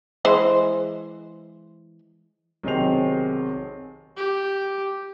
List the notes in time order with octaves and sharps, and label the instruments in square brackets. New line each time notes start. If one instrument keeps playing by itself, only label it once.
[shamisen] E3 G#3 C5
[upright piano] B1 C3 D#3 G#4 C5 F7
[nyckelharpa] G4